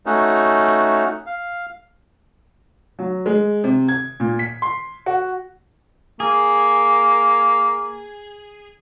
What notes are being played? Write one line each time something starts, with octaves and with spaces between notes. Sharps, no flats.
A3 C#4 D#4 F#4
F5
F#3
G#3
C3
G#6
A#2
B6
C6
F#4
A#3 G#4